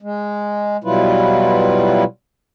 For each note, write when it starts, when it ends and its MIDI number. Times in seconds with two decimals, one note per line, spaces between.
0.01 0.77 56
0.84 2.04 47
0.84 2.04 54
0.84 2.04 55
0.84 2.04 64
0.84 2.04 65
0.84 2.04 71